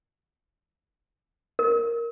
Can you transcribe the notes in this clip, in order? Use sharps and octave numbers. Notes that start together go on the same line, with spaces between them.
A#4